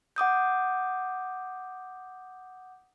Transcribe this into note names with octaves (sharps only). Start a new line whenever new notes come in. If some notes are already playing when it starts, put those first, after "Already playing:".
F#5 D6 D#6 G6